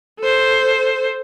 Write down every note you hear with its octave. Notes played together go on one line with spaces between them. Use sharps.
A4 C5